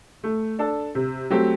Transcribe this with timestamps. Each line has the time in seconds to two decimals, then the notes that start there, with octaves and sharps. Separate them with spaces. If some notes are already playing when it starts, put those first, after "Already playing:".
0.24 A3
0.59 D4 A4
0.95 C3
1.30 F#3 A3 C4 G4